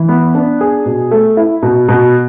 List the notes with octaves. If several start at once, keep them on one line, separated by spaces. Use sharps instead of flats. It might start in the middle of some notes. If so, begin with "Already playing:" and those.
Already playing: E3
B3
D4
G#4
B2
A3
E4
B2
B2